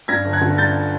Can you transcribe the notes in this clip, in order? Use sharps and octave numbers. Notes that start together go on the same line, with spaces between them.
G2 G#6 A#6
G1
F#6 G#6
D3
G2 G6 A6